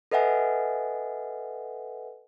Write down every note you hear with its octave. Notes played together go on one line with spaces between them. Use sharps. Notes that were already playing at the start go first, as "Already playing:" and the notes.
A4 B4 D#5 E5 F#5 G#5